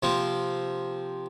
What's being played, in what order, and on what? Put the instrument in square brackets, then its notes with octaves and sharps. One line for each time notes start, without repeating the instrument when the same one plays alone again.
[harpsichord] C3 F3 A#3